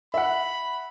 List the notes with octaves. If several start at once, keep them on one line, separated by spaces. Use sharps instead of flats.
E5 F#5 B5